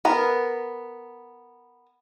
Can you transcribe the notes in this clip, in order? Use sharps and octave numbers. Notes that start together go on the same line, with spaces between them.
B3 A#4